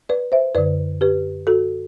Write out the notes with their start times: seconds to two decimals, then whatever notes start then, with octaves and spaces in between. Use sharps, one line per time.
0.09 B4 D5
0.32 C5 E5
0.55 F#2 D3 B4 D5
1.01 G4 B4
1.47 F#4 A4